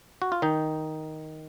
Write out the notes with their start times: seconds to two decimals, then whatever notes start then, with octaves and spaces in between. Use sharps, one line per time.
0.22 F#4
0.32 F4
0.42 D#3 D#4